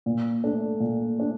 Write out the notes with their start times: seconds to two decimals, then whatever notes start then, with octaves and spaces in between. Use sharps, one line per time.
0.06 A#2
0.44 A3 D4
0.80 A#2
1.18 A3 D4